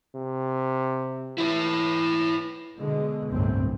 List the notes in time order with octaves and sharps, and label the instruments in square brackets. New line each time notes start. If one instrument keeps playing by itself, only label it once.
[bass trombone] C3
[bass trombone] E3 [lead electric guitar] E4 C#5
[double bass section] B2 D3 G#3
G1 C2 F#2 A2 C3 C4